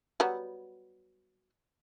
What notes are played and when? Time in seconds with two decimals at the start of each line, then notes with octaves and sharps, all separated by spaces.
0.20 F#3 G3 B3